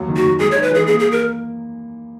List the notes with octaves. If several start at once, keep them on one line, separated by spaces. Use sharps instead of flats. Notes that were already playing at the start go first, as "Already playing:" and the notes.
Already playing: D#2 F#3
D#3
F#4
D#2
G#3 G#4
C#5
D#4
B4
E3 G#4
A#3 G#4
A#3 G#4
A#4